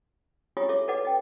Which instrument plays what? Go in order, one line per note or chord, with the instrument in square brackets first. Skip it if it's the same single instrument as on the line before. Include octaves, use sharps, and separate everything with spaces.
[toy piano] E4 F4 G4 C#5 G#5 D#6
A4 C#5 E5 D6
A4 B4 D5 D#5 F#5 D6
D#5 G5